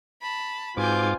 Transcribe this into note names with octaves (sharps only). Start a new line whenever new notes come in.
A5 B5
G#2 B2 C4 F4 G#5 D6 G6